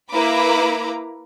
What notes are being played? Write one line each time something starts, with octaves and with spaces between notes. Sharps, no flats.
A#3 E4 B4 A#5 B5 D6